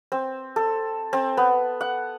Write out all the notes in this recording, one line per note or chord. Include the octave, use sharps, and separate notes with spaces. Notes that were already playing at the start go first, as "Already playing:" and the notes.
C4
A4
C4
B3
F#5